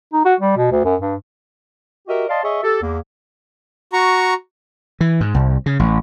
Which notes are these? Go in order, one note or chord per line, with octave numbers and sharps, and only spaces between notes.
D#4
F#4
G3
B2
D2
F#2
G2
F#4 G4 A#4 D#5 E5
D5 D#5 F5 A5 C6
G#4 C#5 D#5 E5 C#6
G4 A4
E2 A#3
F#4 A#5 C#6
E3
G#2
C2
C#3
A1